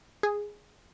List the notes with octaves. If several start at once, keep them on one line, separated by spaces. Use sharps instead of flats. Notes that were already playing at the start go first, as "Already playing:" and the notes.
G#4